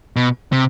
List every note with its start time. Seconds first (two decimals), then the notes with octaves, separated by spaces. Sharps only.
0.16 B2
0.52 C3